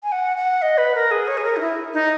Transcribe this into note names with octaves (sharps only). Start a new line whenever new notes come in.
G#5
F#5
F#5
D#5
B4
A#4
G#4
C#5
G#4
A#4
D#4
E4
D#4